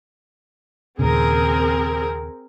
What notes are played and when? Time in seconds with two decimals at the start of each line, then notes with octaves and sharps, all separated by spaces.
0.99 D#2 A#2 C#3 C4 G#4 A#4